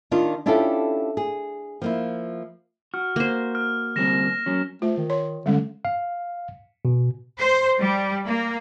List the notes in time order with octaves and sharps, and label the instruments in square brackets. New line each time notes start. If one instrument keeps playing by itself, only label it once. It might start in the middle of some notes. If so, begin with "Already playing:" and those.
[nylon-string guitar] D#3 D4 D#4 F4
C#4 D4 E4 F4 G4 A4
G#4
F3 A#3 E4
[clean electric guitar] F#4 [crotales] F6
[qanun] A#3 C5
[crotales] F6
[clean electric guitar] D2 G3 C4 [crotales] A#6 E7
[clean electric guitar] F#3 C#4
[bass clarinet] A3 [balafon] F4 C5
[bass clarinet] D#3
[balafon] C#5 C6
[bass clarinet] D3 [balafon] G3 G#3 C#4
[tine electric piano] F5
B2
[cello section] C5
G3
A#3